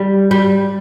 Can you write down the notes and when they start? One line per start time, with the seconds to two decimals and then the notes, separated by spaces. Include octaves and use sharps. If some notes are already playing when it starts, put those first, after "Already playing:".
Already playing: G3
0.31 G3